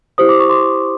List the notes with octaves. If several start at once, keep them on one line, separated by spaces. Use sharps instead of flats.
E4 G4 C5 D#6
D6
C#6
C6 D6